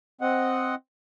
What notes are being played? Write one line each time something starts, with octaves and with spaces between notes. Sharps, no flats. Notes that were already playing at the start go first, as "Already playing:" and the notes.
C4 D#5 F#5